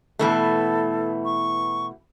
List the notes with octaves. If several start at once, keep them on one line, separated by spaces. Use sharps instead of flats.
B2 E3 A3 A4
C#6